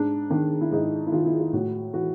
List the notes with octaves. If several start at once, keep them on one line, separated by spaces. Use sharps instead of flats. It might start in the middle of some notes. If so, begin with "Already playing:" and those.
Already playing: G#2 D4
D#3 D4
E4
G#2 D#4
E4
D#3 F4
E4
F4
A2 F#4
E3 F#4